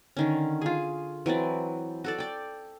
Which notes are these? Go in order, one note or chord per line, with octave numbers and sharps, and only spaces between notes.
D3 D#3 C#4
F4 G#4
E3 F#3 C4 D5
F#4 A4 D5
D5 G5